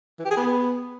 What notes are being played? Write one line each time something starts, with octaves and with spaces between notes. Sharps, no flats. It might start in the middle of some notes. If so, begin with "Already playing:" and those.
E3
G4
G#4
B3